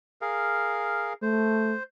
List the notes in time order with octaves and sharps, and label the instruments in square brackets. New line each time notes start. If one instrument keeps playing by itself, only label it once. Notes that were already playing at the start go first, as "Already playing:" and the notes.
[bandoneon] G#4 A#4 F5
[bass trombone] A3 [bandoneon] C5